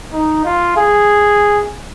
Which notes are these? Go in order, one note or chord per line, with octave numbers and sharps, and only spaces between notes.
D#4
F4
G#4